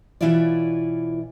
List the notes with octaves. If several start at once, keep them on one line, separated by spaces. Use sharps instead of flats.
B2 E3 E4 F4 C#5 D5